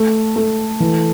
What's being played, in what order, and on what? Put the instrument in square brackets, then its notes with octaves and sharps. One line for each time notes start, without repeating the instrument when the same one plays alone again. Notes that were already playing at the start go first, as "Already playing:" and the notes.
Already playing: [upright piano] A3
A3
E3